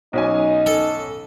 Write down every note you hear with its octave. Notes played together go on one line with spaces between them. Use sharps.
B1 C#4 D#4 G#5
A4